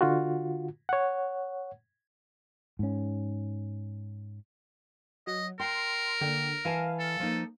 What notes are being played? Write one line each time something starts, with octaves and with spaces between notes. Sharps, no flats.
D3 F4 F#4
C#5 F#5
G#2 C#4
F#3 D#5
A#4 G5 C6
D3 A#3 G5
E3 F5 G#5 A5
A4
F3 A#3 D#4